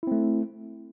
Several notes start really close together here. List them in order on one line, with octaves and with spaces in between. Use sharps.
E4 C4 A3